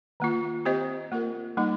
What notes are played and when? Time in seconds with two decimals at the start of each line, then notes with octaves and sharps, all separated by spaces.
0.20 D#3 A#3 F4
0.65 C4 G4 C5 D#5
1.12 A#3 F4 A#4
1.57 G3 A#3 D#4